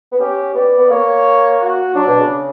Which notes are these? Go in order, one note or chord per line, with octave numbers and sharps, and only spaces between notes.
B3
C#4 G4
B3 D5
B3
A#3 C#5
F#4
F#3 D4
B2
C#3